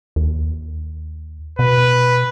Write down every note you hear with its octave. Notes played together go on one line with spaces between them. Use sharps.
D#2
B2 B4